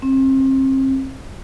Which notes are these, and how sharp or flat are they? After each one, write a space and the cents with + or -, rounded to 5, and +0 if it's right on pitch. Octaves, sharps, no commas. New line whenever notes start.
C4 +35